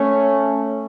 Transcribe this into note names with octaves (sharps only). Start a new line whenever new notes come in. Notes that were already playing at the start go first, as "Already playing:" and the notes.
Already playing: A3 C#4